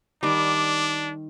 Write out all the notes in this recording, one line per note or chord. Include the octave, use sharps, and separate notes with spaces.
D#3 G3 D4 D6